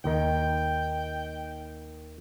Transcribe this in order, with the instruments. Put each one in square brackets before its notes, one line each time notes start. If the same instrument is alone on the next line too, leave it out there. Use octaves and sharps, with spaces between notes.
[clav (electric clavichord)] D#2 D#3 [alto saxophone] G5